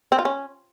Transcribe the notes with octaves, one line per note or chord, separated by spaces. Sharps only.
C4
F4
C#4